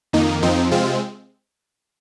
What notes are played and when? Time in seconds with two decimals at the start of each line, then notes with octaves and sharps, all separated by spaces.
0.13 F2 D#3 A#3 D#4
0.43 F2 F3 C4 D#4
0.71 C3 G#3 C4 F4